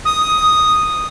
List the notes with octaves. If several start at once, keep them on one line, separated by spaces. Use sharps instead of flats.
D#6